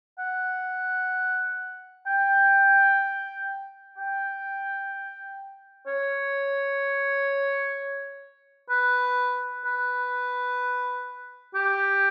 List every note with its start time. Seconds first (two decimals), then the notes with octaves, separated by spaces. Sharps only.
0.19 F#5
2.07 G5
3.97 G5
5.87 C#5
8.70 B4
9.65 B4
11.55 G4